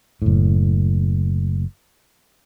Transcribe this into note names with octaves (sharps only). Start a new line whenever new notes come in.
F#1 A2